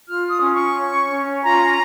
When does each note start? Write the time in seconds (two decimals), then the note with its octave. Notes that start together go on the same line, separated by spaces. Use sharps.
0.08 F4 F6
0.31 D#6
0.42 C#4
0.54 C#6
0.76 C#5
1.10 C#4
1.43 F4 A#5